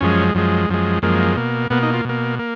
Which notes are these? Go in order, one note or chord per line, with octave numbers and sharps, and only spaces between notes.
F#2 F3 G#3 C#4
F#2 F3 G#3
F#2 F3 G#3
F#2 F3 G#3 A#3
B2 A#3
B2 A#3 B3
D#4
F4
B2 A#3
A#3